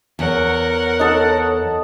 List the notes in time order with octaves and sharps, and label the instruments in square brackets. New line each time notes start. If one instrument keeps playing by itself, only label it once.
[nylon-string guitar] E2 [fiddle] A#4 F#5 [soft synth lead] C#5
[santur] D#4 A4